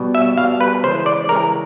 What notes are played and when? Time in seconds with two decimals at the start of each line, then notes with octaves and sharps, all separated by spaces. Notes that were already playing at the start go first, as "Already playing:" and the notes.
Already playing: B2 G3
0.15 E5
0.38 B2 G3 F5
0.60 B4
0.83 C#3 E3 G#3 C5
1.06 D5
1.29 C#3 E3 G#3 A#4